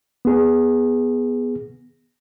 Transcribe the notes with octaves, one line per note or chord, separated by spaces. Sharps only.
B3 G#4